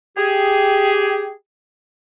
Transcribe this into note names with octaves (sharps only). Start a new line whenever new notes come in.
G4 G#4